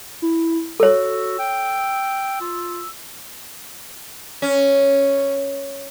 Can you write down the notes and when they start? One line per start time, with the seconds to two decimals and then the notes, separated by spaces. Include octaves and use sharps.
0.22 E4
0.80 F#4 A4 C#5 E6
1.39 G5
2.41 F4
4.42 C#4